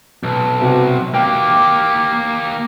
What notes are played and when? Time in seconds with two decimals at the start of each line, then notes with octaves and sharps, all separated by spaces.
0.24 B1 A5
0.59 G2 C3 F#4
1.14 A#3 G4 G5 D6